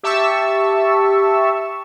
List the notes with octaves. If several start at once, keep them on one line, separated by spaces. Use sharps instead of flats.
G4 E5 A5 C#6 E6